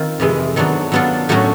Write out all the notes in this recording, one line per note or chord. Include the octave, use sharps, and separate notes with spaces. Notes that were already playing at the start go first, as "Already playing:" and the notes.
Already playing: D#3 C4 F4
F2 C3 E3 G#3
D#3 F#3 B3 D4
F#3 B3 D4 F4 A4
A2 F#3 A3 C#4 F#4